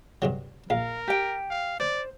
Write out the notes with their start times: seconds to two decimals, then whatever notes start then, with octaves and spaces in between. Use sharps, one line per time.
0.22 G2 C3 F#3
0.70 A#1 A#4 F5
1.08 G4 G5
1.50 F5
1.80 C5 D5